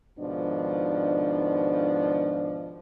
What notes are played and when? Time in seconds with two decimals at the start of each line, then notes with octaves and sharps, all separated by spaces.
0.19 G#2 B2 D#3 F3 D4 D5